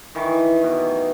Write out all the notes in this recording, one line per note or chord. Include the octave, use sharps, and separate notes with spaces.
D#3 E3 A5 C#6
B2